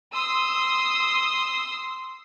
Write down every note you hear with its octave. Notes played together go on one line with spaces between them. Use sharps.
C6 D#6 E6